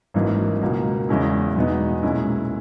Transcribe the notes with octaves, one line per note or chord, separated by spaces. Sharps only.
G#1 F#2 E3 A#3 D#4
C#2 B2 A#3
E2 C#3 G#3 C#4 E4
E2 B2 G#3 B3 D#4
B1 A#2 G#3 C#4 E4